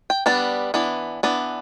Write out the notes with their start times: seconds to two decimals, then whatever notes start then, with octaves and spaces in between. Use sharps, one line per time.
0.10 G5
0.26 G3 B3 D4 A5
0.74 E3 B3 D4
1.23 E3 B3 D4